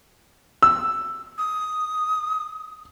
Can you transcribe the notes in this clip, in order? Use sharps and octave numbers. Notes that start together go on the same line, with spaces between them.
E6
D#6